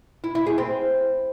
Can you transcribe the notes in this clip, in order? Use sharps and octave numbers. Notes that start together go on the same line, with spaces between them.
E4
E4
G#4
C4